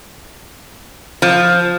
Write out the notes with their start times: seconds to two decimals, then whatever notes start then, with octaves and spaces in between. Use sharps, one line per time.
1.22 F3